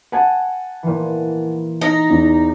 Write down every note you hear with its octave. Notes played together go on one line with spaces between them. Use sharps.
F#5 G#5 A5
A#2 E3
D#4
E2